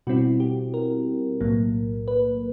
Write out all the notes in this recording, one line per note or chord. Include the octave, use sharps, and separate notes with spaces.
B2 G3 C4 E4 F#4
G4
A#4
B1 A2 F#3 A#3
B4